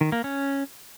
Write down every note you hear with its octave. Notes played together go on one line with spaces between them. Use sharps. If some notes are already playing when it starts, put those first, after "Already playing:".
D#3
A#3
C#4